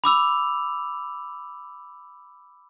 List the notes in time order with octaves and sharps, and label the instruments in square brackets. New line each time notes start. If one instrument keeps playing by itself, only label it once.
[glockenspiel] B5 D6 E6 F7